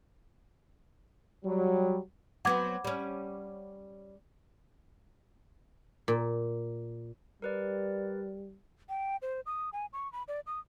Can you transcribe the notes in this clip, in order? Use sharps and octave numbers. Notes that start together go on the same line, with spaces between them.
F#3 G3
F#3 B3 C4 F#5 D6 G#6
G3 C#4
A#2
G3 A#4 B4 D5
G5
C5
D#6
G#5
C#6
B5
D5
D#6